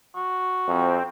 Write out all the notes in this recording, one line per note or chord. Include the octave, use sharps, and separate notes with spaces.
F#4
F2 C4